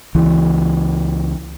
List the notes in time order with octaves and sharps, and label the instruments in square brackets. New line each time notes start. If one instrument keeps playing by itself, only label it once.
[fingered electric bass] C#2 E3